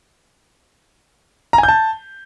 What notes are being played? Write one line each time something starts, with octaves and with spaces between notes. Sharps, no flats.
A#5
G#5
G6
A5